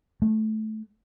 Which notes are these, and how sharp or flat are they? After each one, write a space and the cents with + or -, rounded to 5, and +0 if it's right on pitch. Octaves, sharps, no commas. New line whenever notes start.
A3 -15